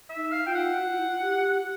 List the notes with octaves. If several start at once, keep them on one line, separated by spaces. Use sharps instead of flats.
E5
D#4
F5
F4 G5
F#5
F#4
F4
E4
F4
G4